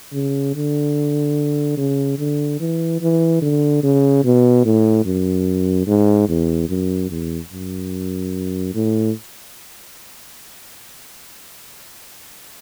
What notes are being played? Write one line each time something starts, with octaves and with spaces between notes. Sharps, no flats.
C#3
D3
C#3
D3
E3
E3
D3
C#3
B2
A2
F#2
G#2
E2
F#2
E2
F#2
A2